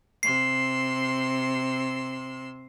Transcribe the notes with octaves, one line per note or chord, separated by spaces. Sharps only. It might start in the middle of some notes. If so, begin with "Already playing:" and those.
C3 C6 E6 C7